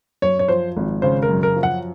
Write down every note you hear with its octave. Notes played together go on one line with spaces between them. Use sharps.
F#2 C#5
C#5
F3 C5
G#1
C#3 C5
A#4
F#2
A#4
F3
F#5